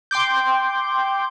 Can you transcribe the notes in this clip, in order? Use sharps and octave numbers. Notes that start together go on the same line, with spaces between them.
G5 C6 D6 G6